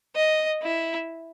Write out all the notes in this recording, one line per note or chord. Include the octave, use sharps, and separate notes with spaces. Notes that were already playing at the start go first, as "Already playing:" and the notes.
D#5
E4